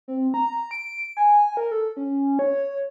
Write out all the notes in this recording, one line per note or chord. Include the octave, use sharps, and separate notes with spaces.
C4
A#5
D7
G#5
A#4
A4
C#4
C#5